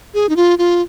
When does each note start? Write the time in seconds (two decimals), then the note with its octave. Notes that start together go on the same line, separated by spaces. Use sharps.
0.14 G#4
0.29 D#4
0.36 F4
0.58 F4